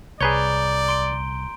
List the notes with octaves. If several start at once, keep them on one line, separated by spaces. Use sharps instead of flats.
C2 G#4 B4 C#5 D5 A#5 G6 G7
C6 D7